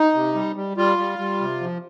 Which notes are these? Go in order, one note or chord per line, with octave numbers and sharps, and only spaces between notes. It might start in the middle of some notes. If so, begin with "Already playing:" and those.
Already playing: D#4
C3
G3
G3
G3 F4
G3
G3
C3
F3